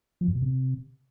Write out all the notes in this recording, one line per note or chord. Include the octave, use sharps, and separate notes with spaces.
F3
F#2
B2
C3